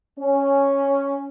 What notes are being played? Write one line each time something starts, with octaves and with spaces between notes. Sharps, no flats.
C#4